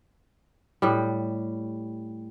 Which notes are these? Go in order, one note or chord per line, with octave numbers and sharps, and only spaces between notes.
A2 G3